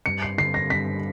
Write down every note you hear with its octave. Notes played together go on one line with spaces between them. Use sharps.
G2 C#7
C7
D3 C7
A#6
G2 B6